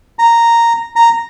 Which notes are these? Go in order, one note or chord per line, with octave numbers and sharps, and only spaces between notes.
A#5
A#5